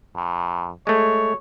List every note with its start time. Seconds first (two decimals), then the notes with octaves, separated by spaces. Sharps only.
0.15 F2
0.87 G#3 A3 C#5